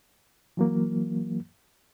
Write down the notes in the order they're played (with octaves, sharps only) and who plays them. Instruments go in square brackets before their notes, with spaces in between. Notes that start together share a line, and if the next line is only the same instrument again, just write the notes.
[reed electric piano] E3 F#3 A#3